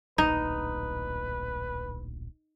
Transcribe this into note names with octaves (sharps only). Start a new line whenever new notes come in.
D1 A#1 D#4 B4